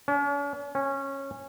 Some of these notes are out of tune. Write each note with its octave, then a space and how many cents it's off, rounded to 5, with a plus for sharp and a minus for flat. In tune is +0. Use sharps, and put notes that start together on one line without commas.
C#4 +45
C#4 -15